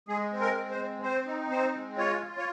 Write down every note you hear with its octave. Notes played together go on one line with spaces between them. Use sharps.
G#3 G#4
C4
A#4
G#3
C5
C4
C4 C5
D#4
C4 C5
G#3
F4 C#5
F4
C#5